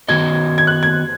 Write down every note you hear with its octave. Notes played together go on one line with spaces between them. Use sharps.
D#3 B3 F#4 D#5 G#6
G#6
F#6
G#6